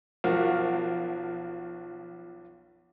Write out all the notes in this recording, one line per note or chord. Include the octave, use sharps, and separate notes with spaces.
B1 F3 F#4 A#4 F5 F#5